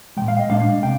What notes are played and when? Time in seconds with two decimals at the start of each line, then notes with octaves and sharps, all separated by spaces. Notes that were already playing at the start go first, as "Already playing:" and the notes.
0.17 F3 G#3 G5
0.21 A#2
0.28 F5
0.39 D#5
0.49 A#2 G#3 D4 F5
0.83 C3 G5